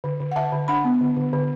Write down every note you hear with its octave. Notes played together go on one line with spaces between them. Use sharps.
D3
D3
F#5
D3 E5 A5
D3
D4 F#5 B5
B3
D3
D3
D3